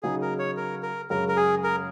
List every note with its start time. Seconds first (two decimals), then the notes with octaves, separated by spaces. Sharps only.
0.03 C#3 F#3 D#4 G#4
0.22 A#4
0.39 C#5
0.57 A#4
0.83 A#4
1.10 F#2 C#3 G#3 C#4 A#4
1.28 A#4
1.37 G#4
1.64 A#4